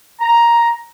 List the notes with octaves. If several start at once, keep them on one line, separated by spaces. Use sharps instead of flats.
A#5